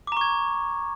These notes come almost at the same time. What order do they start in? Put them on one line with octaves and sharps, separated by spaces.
D6 A#5 C#6 G#6